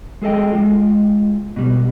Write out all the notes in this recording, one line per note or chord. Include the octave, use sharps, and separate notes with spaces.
G#3 G#4 A4 D#5 G5
G#3 F4
B2 G3